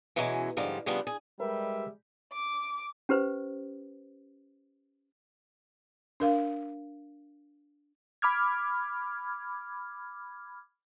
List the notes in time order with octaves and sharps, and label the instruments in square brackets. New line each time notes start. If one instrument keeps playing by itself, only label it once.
[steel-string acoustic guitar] B2 E3 F#3 G#3 C#4
G#2 D3 F3 G3
C#3 F3 G3 B3 D4
G#4
[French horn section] G3 G#3 [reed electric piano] A#4 B4 [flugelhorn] E5
[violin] D6
[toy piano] C#4 G4 B4 C5
[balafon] D4 A#4 F5
[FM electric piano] B5 D6 F6 G#6